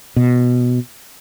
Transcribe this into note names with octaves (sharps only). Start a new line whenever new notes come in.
B2